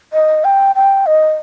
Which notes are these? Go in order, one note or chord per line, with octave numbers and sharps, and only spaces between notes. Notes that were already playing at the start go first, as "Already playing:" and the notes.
D#5
G5
G5
D#5